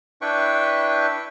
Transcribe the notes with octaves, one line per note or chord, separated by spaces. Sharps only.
D4 E4 B4 G5 C#6